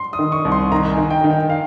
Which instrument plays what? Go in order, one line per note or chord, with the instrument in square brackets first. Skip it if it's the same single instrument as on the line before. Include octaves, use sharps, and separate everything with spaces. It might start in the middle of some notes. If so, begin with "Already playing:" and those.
Already playing: [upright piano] C6
D#6
[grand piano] D#3
[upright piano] C#6
[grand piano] C2
[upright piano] C6
[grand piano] D#3 [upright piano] A#5
[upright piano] G#5
[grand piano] D#3
[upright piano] G5
[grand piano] D#3
[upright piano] G5
F5